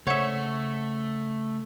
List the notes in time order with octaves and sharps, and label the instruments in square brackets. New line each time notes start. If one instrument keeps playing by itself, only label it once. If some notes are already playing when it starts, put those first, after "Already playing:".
[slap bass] C#3 [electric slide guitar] A3 [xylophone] C5 F#5 [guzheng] C#5 E5